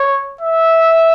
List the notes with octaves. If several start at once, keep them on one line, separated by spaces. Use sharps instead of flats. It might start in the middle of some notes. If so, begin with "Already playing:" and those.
Already playing: C#5
E5